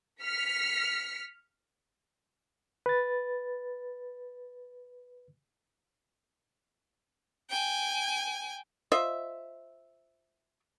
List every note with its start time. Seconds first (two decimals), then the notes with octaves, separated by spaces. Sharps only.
0.24 F6 B6 C#7
2.86 B4 A6
7.50 G5 G#5
8.92 F4 C5 D#5 E5